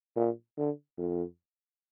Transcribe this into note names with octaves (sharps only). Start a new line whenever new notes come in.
A#2
D3
F2